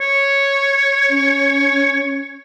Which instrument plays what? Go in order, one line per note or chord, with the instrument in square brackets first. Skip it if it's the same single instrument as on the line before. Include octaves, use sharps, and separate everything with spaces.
[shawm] C#5
[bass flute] C#4